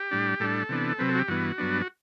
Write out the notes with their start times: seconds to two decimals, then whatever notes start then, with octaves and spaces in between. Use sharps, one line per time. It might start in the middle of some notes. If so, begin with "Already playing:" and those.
Already playing: G4
0.11 A2 G3 D4
0.40 A2 G3 D4 A4
0.69 C3 E3 B3 D4
0.98 C3 F#3 C4 B4
1.09 A4
1.15 F#4
1.19 G4
1.28 G2 E3 B3 F#4
1.58 G2 F#3 B3 D4
1.82 F#4